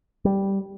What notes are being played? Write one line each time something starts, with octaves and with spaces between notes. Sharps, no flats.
G3